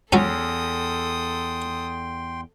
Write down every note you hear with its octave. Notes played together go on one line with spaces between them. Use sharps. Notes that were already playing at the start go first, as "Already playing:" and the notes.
E2 F#3 C#4 A4 G5 C6 D#6